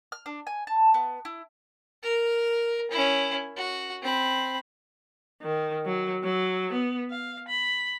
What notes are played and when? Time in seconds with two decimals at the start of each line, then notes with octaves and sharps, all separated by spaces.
0.12 F6
0.26 D4
0.47 G#5
0.67 A5
0.94 B3
1.25 E4
2.03 A#4
2.91 C#4 E4
3.57 F#4
4.03 C4 B5
5.42 D#3
5.86 F#3
6.23 F#3
6.73 B3
7.11 F5
7.48 B5